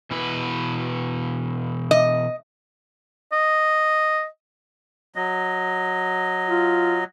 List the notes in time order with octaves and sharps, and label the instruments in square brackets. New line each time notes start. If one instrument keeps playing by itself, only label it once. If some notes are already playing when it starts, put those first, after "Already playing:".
[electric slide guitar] B2 E3 B4
[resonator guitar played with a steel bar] D#5
[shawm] D#5
[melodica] F#3 D#5
[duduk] F4